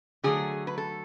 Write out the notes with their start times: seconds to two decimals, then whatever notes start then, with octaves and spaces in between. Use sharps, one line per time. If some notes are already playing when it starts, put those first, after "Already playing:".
0.24 D3 F#3 A3 G#4
0.67 B4
0.78 A4